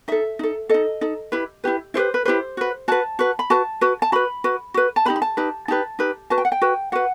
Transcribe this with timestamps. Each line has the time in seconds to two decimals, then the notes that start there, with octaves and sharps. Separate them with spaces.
0.08 D#4 A4 E5
0.39 D#4 A4
0.69 D#4 A4 D#5
1.01 D#4 A4
1.32 E4 G4 B4
1.64 E4 G4 B4
1.94 E4 G4 B4 C5
2.14 B4
2.25 E4 G4 B4 C5
2.57 F#4 B4
2.88 F#4 B4 A5
3.19 F#4 B4
3.39 B5
3.50 F#4 B4 A5
3.81 F#4 B4
4.02 A5
4.12 F#4 B4 B5
4.44 F#4 B4
4.74 F#4 B4
4.96 A5
5.05 D#4 G4 B4 B5
5.16 B5
5.22 A5
5.37 D#4 G4 B4
5.68 D#4 G4 B4 A5
5.99 D#4 G4 B4
6.30 F#4 B4 A5
6.38 G5
6.45 F#5
6.52 G5
6.62 F#4 B4
6.92 F#4 B4 F#5